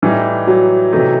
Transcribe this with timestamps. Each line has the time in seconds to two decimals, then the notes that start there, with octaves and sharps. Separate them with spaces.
0.02 A2 E3 G3 D#4
0.47 F#3
0.93 C3 E3 A3 D#4